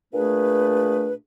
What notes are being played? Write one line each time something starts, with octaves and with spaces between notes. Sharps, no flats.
A#2 A3 D4 G#4 B4